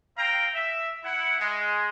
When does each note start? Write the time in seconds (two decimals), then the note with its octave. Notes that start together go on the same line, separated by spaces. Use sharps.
0.17 C4 F5 G5 A#5
0.54 E5
1.04 E4 F#5
1.40 G#3